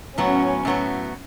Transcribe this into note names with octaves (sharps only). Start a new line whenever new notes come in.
A2 F#3 B3 C#4 F#4
A2 F#3 B3 F#4